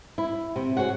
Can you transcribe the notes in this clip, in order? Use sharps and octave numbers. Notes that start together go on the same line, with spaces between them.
E4
C3
F#4 G#4 C#5 F#5